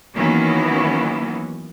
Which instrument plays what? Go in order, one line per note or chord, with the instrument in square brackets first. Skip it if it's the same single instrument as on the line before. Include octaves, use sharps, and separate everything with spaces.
[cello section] D#3 E3 F#3 A#3 B3 C#4